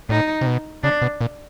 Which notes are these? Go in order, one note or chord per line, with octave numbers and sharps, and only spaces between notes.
A2 D#4
C3
B2
C#3 D4
B2
A#2